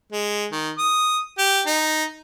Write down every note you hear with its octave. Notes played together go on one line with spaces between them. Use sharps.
G#3
D#3
D#6
G4
D#4